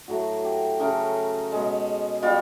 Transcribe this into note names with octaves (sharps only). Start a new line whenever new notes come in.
A2 F#3 A3 F#4
G4
C#3 F#3 A3 A#4
B2 G#3
B2 G3 F4